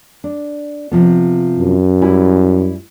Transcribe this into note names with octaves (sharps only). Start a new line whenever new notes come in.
D4
C3 F3 B3
F#2
G3 E4 G#5